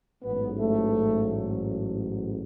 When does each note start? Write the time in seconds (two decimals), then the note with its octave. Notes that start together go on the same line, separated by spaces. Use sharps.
0.22 A1 G#2 F#3 B3
0.58 A3